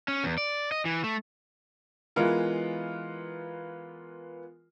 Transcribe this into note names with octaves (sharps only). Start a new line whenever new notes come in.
C#4
E2
D5
D#5
E3
A3
E3 G#3 B3 F4 A#4